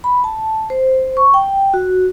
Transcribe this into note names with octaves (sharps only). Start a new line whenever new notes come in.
B5
A5
C5
C#6
G5
F#4